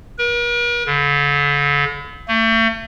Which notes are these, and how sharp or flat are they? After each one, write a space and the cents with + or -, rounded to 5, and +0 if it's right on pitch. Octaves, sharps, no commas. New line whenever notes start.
A#4 +45
D3 -40
A3 +40